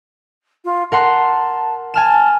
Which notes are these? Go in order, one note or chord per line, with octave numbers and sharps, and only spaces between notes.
F4
A#4 F#5 A5 C6
G#5 A5 F6 E7